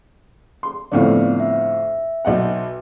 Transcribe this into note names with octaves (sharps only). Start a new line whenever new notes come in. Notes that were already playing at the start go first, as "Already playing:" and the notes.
C6
F2 A2 D3 B3 D5
E5
B1 D#5 F#5